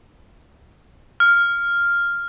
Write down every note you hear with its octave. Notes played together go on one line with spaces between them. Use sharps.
F6